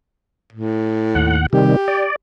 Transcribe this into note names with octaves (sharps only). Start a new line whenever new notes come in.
A2
D#2 F#5
C3 D#3 G3 G4
D5